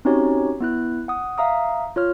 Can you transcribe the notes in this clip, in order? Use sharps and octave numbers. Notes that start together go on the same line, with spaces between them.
C4 C#4 D#4 F#4 G4 C#5
B3 E4 F#6
F#5 D#6
E5 F5 A#5 D#6
F4 C#5 F6